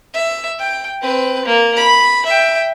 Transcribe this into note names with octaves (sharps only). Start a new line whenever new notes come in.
E5
G5
C4 B4
A#3
B5
E5 G5